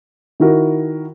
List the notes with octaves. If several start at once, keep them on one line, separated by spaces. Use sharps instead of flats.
D#3 E4 F#4 A#4